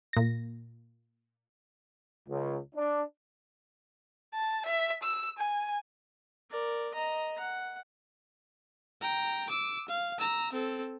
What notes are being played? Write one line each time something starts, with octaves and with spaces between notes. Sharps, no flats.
A#2 A#6
C#2
D4
A5
E5
E6
G#5
A#4 D5
D#5 A#5
F#5
G5 A#5
D6 E6
F5
A#5 E6
C4 A4